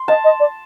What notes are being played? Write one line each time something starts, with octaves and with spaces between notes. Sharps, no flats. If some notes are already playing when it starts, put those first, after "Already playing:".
Already playing: C6
D#5 A5
D#5
D5